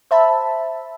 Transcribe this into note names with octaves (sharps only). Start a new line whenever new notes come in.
C5 E5 A5 B5